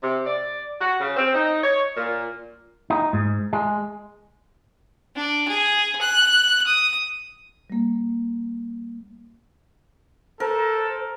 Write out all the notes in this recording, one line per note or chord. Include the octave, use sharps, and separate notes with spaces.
C3
D5
F#4
C#3
C4
D#4
C#5
A#2
D#4
G#2
G#3
D4
G#4
F#6
D#6
G3 A#3
A4 A#4 C5